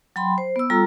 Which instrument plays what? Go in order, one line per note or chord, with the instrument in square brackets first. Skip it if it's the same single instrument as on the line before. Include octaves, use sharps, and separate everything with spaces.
[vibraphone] F#3 G5 B5 C6
C5
B3 E6
G3 F4 A4 A#5